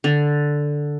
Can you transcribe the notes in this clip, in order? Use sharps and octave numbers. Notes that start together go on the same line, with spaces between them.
D3